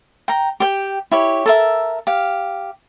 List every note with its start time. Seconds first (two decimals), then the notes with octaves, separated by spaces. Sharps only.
0.28 G5 A#5
0.60 G4 G5
1.12 E4 G4 C#5
1.46 A4 A#4 E5
2.07 G4 F5